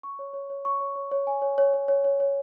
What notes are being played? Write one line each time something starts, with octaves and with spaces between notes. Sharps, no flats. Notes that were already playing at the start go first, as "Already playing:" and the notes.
C#6
C#5
C#5
C#5
C#6
C#5
C#5
C#5
G#5
C#5
C#5
C#5
C#5
C#5
C#5